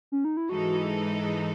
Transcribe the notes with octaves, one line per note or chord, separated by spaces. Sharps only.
C#4
D#4
E4
G#2 E3 G#3 D#4 F#4 A4